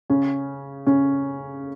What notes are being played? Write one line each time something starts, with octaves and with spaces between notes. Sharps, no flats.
C#3 C#4
C#3 C#4